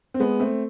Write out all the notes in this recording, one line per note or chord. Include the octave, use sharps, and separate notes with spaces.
C4
G#3 B3
A3 C4